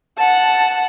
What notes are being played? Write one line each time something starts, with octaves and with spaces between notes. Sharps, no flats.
F#5 A5